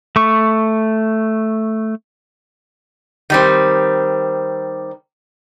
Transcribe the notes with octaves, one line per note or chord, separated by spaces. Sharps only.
A3 C#6
D#3 G3 C4